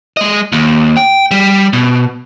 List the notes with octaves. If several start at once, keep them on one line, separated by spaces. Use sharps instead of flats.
G#3 D#5
D#2
G5
G3
B2